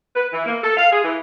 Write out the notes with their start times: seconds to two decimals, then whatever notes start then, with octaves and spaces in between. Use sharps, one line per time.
0.16 B4
0.33 E3
0.46 A#3
0.63 A4
0.78 F5
0.92 G#4
1.04 E3